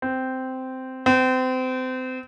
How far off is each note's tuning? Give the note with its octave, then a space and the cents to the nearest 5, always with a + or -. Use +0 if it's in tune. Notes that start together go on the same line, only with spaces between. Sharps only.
C4 -10
C4 -30